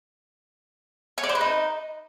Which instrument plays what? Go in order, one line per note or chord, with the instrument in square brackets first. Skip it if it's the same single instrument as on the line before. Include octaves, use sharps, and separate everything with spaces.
[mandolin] C#5
D5
C5
B4
D#4